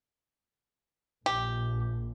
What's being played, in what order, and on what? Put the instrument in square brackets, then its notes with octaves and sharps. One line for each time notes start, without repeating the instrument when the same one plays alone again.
[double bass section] A#1 [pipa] G4